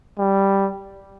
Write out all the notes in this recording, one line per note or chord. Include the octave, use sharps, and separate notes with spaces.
G3